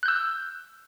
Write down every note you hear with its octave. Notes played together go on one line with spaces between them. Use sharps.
E6 F#6 G6